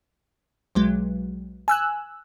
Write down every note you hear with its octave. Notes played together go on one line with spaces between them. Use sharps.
B1 F#3 G#3
G#5 E6 F#6